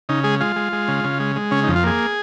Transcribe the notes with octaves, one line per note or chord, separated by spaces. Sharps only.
C#3 D#4
G#3 G#4
G#3 F4
G#3
G#3
C#3
C#3
G#3
G#3
C#3 C#4
D#4
F2
F4
A#3 G#4